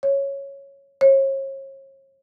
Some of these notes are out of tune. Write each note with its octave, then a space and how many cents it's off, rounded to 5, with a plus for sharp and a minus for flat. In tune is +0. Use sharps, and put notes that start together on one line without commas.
C#5 -5
C#5 -40